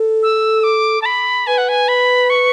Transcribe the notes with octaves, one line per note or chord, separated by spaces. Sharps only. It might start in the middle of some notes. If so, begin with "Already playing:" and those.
Already playing: A4
E6
D6
A5
B5
B4 G#5
F#5
G#5
B5
C#6